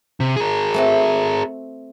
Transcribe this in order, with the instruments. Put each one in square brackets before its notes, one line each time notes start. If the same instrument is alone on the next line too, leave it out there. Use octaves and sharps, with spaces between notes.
[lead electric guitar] C3
G#4 A#4
[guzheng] A3 C4 F#4